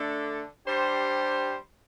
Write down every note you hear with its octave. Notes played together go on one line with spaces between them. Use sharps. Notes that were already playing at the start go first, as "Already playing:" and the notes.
Already playing: D3 A3 D4 A4
G3 D4 G4 C5